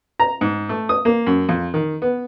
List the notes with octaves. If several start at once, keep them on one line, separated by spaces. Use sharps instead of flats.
A#5
G#2
A3
D#6
A#3
F#2
F2
D#3
B3